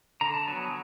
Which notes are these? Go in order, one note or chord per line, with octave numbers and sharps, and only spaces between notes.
D3 A#5
A5
F#3 B3 G#5